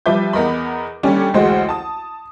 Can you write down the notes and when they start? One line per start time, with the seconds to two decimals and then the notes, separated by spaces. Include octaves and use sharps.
0.06 F3 G3 B4 E5 D6 G6
0.33 E2 B3 A#4 D#5 B5
1.03 D#2 D3 G3 C#4 C#5 D5
1.34 A1 D2 G#3 F#4 C5
1.69 A5 D#6